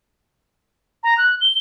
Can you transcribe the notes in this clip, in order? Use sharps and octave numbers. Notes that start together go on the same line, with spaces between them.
A#5
F#6
G7